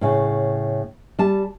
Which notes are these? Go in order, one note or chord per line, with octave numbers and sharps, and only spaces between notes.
A2 C#3
G3 A5